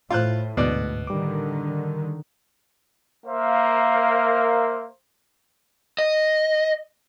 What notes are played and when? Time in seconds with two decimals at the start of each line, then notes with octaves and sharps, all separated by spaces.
0.10 A2 F4 C5 F#6
0.57 D2 G#2 B2 D5 F#6
1.07 D3 D#3 G3 D6
3.25 A#3 A#4 C5 E5 F5
5.99 D#5